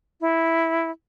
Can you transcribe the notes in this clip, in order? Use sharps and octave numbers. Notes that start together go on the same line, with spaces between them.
E4